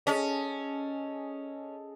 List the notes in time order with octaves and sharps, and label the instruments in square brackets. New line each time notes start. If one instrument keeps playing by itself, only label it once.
[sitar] C#4 [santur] G#4 A4 D#5